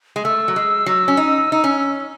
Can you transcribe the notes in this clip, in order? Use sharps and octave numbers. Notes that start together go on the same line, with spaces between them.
G#3
A3 E6
F#3
G#3
F#3
C#4
D#4
D#4
C#4